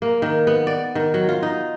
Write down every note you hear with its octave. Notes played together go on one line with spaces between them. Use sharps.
A#3
D#3
B3
D5
D#3
F#3
F4
D#4